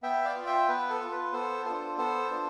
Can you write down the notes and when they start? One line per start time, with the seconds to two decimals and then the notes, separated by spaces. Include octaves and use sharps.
0.03 B3 E5 G5
0.25 D5 F5
0.36 F4
0.46 E5 G5
0.68 B3 B4
0.90 A4
1.00 F4
1.11 B4
1.32 B3 A4 C5
1.65 D4 F4 A4 C5
1.97 B3 A4 C5
2.31 D4 F4